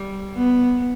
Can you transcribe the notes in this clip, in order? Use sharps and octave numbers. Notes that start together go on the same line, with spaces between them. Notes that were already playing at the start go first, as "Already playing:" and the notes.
Already playing: G3
B3